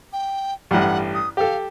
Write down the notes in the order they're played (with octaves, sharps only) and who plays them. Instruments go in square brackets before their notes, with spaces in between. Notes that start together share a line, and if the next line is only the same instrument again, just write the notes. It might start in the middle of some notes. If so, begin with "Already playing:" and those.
[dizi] G5
[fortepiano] A1 G2 [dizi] F#5
[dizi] D#6
[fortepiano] G4 A4 [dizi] F5